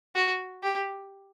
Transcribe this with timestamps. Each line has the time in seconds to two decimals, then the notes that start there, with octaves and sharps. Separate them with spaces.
0.15 F#4
0.63 G4